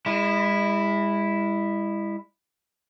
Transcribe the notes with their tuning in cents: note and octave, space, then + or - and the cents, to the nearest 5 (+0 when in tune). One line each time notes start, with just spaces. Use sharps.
G#3 -40 E4 +0